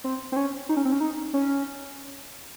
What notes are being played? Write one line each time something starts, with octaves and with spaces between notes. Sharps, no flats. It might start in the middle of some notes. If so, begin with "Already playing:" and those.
C4
C4
C#4
D#4
C#4
C4
C#4
D#4
C#4